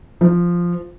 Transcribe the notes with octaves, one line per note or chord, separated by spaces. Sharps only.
F3